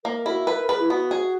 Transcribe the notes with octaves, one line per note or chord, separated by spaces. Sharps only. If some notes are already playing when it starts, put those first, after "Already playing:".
A#3 A#4
E4 F#4
A#4 B4
A#4
G#4 B4
E4
B3 F#4
G#4